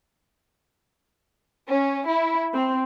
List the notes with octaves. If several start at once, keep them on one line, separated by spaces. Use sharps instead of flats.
C#4
E4
C4